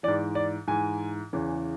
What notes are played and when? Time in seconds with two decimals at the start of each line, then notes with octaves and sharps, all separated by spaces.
0.03 G#2 E3 D5
0.35 D5
0.67 G#2 E3 G#5
1.33 E2 C#3 E3